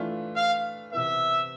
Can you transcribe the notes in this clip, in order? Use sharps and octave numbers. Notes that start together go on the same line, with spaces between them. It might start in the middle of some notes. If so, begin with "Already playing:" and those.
Already playing: E3 A3 D4 F4
F5
C3 E3 B3 E5